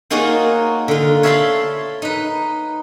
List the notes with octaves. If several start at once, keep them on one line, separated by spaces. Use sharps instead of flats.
A#3 D#4 F4 F#4 G#4 C#5
D3 F4
C#5 E5 F5 A5 B5 C6
D#4 B4